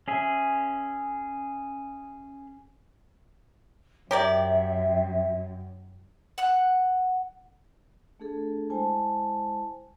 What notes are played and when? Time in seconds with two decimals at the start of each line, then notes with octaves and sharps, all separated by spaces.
0.08 C#4 G#4 E5
4.11 F#2 G4 A#4 C#5 D5 E5 G5
6.38 F#5 F#6
8.20 A3 D4 G#4 A4
8.70 G#3 E4 C5 G#5 A5